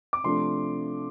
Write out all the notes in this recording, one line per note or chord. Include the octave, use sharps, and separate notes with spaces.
D6
C3 F3 A3 D4 C6